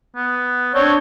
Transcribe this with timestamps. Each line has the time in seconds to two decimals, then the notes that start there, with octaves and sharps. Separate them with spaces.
0.16 B3
0.75 C4 D4 C#5